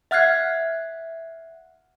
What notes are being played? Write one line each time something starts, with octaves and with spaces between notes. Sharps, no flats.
E5 F#5 F6 F#6 G#6 C7